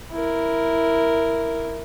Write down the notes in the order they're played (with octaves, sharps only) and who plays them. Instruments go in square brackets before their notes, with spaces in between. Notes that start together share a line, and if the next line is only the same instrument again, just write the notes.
[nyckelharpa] E4 A#4